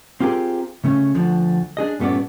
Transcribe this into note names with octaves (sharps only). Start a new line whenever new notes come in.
C4 F4 G4 G#4 A#4
C#3 A3 C#4
D2 D3 F3
D4 G#4 D#5
G2 A#2 A3 B3 C#4 D5